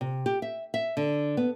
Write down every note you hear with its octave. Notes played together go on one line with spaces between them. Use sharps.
C3
G4
E5
E5
D3
B3